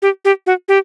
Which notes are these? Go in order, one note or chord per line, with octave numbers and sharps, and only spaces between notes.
G4
G4
F#4
G4